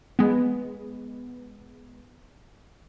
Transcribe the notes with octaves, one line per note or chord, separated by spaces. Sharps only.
G#3 B3